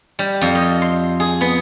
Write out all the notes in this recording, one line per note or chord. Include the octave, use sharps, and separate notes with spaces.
G3
F2
D#5
C6
G#4
B3